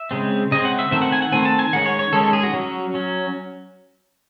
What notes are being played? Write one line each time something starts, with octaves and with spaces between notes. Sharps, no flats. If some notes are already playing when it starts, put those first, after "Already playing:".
Already playing: E5
C#3 G#3 C4
C#3 G#3 C4 D#5
F#5
E5
D#3 A3 C4 E5
F#5
G#5
F#5
D#3 A3 C4 G#5
A5
G#5
D#3 G#3 C#4 F#5
C#5
C#5
D#3 G#3 C#4 A4
A4
G#4
F#4
F#3 C#4
F#3 C#4